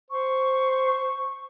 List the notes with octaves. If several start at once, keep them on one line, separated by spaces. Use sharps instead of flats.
C5 C#6